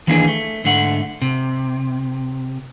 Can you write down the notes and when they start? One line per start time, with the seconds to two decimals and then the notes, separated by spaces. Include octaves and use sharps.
0.07 D#3 E3 A#3 D4 G4 G#4
0.28 A3
0.64 G#2 D3 A3 F#5
1.22 C3